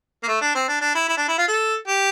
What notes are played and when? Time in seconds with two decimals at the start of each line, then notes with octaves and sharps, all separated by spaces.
0.23 A#3
0.28 A3
0.42 D4
0.55 C4
0.68 D4
0.81 D4
0.95 E4
1.08 E4
1.17 D4
1.28 E4
1.38 F4
1.48 A4
1.87 G4